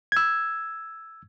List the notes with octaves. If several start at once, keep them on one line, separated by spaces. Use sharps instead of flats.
E6 G#6